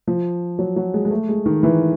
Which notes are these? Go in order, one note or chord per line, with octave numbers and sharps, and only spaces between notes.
F3
F#3
F#3
G#3
G#3
A3
G#3
D#3
E3